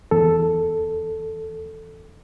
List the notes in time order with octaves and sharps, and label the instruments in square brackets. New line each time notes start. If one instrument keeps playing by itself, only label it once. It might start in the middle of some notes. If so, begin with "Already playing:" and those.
[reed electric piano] E2 A4